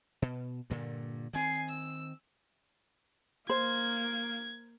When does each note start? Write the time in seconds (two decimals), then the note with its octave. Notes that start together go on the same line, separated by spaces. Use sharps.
0.22 B2
0.70 G2 A#2 D3
1.33 D#3 C4 G#5 C7
1.69 E6
3.49 A#3 C5 G#6